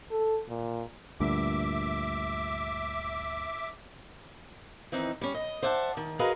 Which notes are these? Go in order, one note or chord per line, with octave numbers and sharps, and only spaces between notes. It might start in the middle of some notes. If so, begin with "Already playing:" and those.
A4
A#2
D2 G2 A#2 E5 D6
D#3 E3 C4 D#4
G3 C#4
D#5
C5 D5 E5 F#5 A5
D#3
F#4 G#4 A#4 B4 D#5 F5